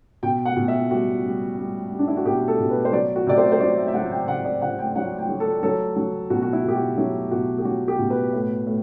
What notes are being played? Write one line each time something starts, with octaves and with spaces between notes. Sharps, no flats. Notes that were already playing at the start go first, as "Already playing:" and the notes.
B2 G5
F#5
B2
E5
G3 F#4
G3
G3
G3
D4
E4
F#4
B2 G4
A4
B2
B4
C5
F#3 D5
F#4
C3 D5
C5
C5
F#3 D5
E5
E5
F#3 F#5
G5
C3 F#5
D5
C3 F#5
G5
F#3 F#5
G5
F#3
A4
F#3 A4
F#3
B2 F#4
F#4
E4
B2 G4
F#4
F#3 E4
B2 F#4
G4
F#3 F#4
G4
B2
B4
A2
A2